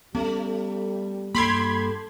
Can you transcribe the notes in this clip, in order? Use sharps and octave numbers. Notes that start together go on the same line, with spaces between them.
G3 A3 B3 C#4
G2 A#3 G4 A4 B5 C6 G#6